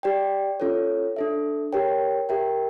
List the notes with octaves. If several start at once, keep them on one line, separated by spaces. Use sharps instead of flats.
G4 D5 G5
C#4 F4 A4 C#5
D4 A4 E5
G4 A#4 C#5 G5
G4 A#4 E5 G5